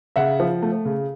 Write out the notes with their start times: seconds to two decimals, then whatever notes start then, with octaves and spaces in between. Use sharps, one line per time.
0.16 C#3 E5 F#5
0.40 F3
0.62 A3
0.85 C#3